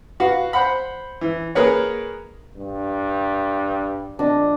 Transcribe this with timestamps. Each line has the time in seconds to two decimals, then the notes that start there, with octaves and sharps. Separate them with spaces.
0.20 F#4 B4 F5
0.53 C5 F#5 B5
1.21 E3
1.55 A#3 G#4 A#4 B4 C#5
2.56 G2
4.19 A#1 D4 D#5